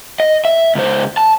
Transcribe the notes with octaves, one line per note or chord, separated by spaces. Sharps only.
D#5
E5
C#2 C5
A5